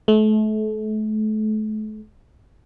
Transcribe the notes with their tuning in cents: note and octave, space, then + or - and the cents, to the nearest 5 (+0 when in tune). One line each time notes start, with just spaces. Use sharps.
A3 -35